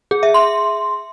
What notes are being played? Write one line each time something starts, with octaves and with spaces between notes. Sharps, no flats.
G#4
E5
C6